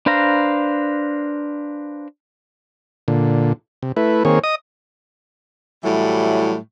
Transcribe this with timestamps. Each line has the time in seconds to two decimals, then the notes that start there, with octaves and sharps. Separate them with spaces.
0.06 D4 B4 C5 F5 A#5
3.08 A#2 D3
3.83 C3
3.97 A3 E4 B4
4.25 D#3 A#3 C4 G#4 C#5
4.44 D#5 D#6
5.84 A2 E3 F#3 G3